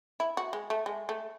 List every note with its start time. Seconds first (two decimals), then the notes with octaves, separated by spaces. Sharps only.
0.20 E4
0.37 F#4
0.53 G#3
0.70 A3
0.86 G#3
1.09 A3